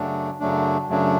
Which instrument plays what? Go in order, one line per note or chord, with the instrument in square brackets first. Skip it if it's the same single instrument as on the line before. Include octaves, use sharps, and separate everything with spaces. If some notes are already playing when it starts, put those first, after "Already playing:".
Already playing: [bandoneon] F#2 C#3 F#3 A3 D4
F#2 C#3 F#3 A3 D4
F#2 C#3 F#3 A3 D4